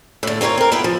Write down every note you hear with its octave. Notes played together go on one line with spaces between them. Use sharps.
A2 D3
C4 F4 A#4 C5 C#5
C4 A#4
B3 E4 F4 G5
F3